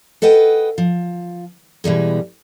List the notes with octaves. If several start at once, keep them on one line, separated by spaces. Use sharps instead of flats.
A4 B4 D#5 F#5 G5
F3
B2 E3 G3 G#3